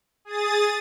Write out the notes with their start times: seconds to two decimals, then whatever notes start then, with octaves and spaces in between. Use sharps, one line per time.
0.25 G#4 D#6 A6